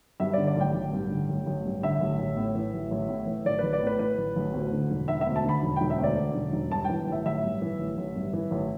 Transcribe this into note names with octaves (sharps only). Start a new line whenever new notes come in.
G2 E5
D3 D5
D5
A1 G5
A1
G2
D3
A1
A1
G2
D3 E5
A1
A1
A2
E3
A1
A1
A2
E3
A1 D5
A1 B4
D5
A2 B4
E3 B4
A1
A1
D2
D3
E1
E1 E5
E5
D2
A5
D3 B5
E1
E1 G5
E5
D2
D5
D3
E1
E1
G2 A5
E3 G5
A1
E5
A1 E5
G2
E3
A1
A1
G2
E3
A1